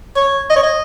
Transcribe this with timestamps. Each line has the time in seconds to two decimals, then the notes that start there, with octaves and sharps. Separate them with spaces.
0.16 C#5
0.50 D#5
0.56 C#5
0.63 D#5